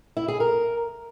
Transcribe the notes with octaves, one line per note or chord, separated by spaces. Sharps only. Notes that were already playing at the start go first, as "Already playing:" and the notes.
E4
G#4
A#4